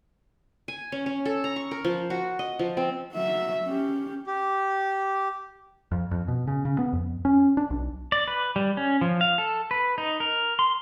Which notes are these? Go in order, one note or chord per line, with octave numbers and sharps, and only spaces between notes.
G#5
C#4
C#4
A4
A#5
C#6
A#4
F3
F#4
D#5
F3
C4
F#3 E5
C#4 G4
G4
F2
F2
B2
C#3
C#3
B3
F2
C#4
D4
B1
D5
B4
G3
C#4
F3
F5
A4
B4
D#4
A#4
C6